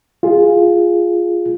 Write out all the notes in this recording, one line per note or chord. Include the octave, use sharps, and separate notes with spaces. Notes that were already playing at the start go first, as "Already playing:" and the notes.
F4 G#4